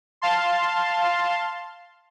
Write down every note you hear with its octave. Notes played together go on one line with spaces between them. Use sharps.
F5 A5 C6